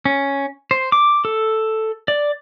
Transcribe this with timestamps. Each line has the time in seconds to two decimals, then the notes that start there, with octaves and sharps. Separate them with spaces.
0.05 C#4
0.71 C5
0.92 D6
1.25 A4
2.08 D5